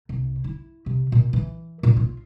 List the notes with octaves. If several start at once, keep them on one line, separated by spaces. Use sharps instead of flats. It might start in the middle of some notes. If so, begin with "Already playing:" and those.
C2
E4
C3
A#2
E3
A#2
F4